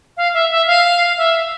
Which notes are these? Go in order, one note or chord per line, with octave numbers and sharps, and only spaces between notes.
F5
E5
E5
F5
E5